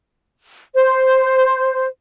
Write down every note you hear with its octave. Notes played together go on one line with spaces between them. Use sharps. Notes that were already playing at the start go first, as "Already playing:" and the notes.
C5